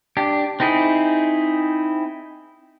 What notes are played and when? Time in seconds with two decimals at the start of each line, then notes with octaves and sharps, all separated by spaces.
0.17 D4 G4
0.60 C4 D#4 E4 G#4